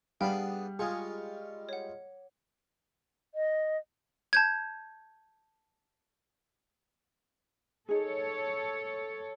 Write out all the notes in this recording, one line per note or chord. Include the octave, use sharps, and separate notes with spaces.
G3 B3 D4 G#4 F5 G5 B5
G#3 F4 G#4 C#6
C#5 F#5
D#5
A5 G6 G#6
D#4 G#4 A4 C#5